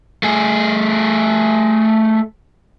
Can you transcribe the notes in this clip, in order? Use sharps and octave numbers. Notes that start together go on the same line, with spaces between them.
A3 G#4